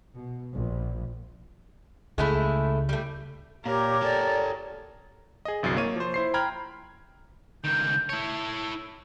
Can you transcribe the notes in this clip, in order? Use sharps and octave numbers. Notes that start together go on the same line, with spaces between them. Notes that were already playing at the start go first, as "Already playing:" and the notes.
B2
A#1
C#2 C#3 G#3 A3 E4
G3 A3
A#2 G4 A#4 C#5
G4 A4 D5
G#4 D#5
G1 C2 F#3 A6 C7
A#3 C#5 D#7
F3 C5
E4 C5 C7
G5 A#5 B5 F6 G#6
C#2 D#3 G6
E4 C#5 A5